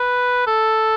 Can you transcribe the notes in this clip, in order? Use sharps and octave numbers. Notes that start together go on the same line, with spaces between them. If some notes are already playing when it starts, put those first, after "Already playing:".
Already playing: B4
A4